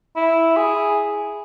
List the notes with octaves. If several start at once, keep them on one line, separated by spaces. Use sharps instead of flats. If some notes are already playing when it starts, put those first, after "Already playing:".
E4
G#4